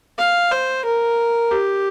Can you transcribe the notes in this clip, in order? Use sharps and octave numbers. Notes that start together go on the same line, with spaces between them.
F5
C5
A#4
G4